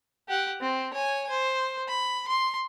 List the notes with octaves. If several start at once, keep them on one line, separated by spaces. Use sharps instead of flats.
G4 F#5
C4
C#5 G#5
C5
B5
C6